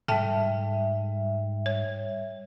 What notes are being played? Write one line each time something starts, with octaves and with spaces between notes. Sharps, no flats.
G#2 G3 A4 E5 G5 A5
C#5